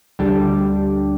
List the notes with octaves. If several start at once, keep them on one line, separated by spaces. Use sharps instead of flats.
D2 D3 G3 D4 G4